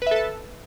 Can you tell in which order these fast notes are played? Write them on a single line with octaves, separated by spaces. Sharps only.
B4 E5 A4 A5